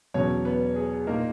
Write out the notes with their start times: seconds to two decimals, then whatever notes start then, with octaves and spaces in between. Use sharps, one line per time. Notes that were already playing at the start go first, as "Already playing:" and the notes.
0.14 E2 B2 F#3 C#4 C#5
0.45 B3 B4
0.76 G#4
1.07 A#2 A#3 D#4 A#4